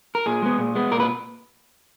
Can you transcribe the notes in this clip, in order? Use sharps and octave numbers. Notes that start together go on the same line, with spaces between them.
A#4
A#2 G#4
G#3 B3
A#2
G#3 B3
A#2 A#4
B4